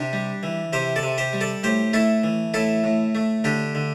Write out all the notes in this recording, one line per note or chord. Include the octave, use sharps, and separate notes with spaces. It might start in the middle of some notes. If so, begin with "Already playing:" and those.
Already playing: C3 D4 G4
G3
E3
C3 G4 C5
A4 D5
C3
G4 C5
G3
A4 D5
A2 G4 C5
A3 E4 A4
E3
A2 E4 A4
A2
A3
D3 D4 G4
D3